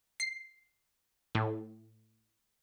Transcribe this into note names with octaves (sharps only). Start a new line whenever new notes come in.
C7
A2